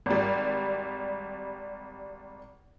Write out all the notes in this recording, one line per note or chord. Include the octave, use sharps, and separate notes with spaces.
G#1 G3